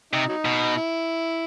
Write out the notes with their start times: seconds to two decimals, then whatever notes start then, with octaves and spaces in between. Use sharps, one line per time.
0.13 C3 D#4
0.28 F#3 D#4
0.45 B2
0.76 E4